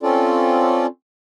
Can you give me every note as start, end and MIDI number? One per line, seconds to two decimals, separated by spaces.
0.03 0.86 60
0.03 0.86 61
0.03 0.86 65
0.03 0.86 69
0.03 0.86 74